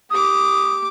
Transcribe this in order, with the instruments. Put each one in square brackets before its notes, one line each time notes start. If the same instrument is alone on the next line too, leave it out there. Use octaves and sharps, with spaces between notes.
[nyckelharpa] G4 D6 [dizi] D#6